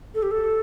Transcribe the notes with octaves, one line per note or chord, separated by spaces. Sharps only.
A4
G4
A4